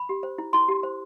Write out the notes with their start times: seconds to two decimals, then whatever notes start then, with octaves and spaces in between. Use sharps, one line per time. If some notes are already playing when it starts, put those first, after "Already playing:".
Already playing: B5
0.09 G4
0.23 C5
0.38 E4
0.53 E4 C6
0.68 G4
0.83 C5